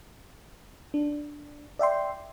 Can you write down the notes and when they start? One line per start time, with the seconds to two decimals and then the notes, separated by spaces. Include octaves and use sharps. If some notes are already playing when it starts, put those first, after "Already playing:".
0.94 D4
1.79 D5 E5 G5 C6